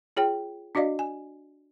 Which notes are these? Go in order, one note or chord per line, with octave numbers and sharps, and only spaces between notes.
F4 G#4 C#5 G5
D4 F#4 D5 D#5 F5
G#5